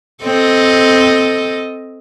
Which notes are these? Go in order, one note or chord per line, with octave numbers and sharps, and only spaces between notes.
C4 A4 D#5